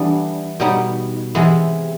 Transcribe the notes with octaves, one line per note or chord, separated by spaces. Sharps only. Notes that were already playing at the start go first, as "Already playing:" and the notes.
Already playing: E3 G3 B3 D4
B2 G3 B3 D#4
C3 E3 G#3 B3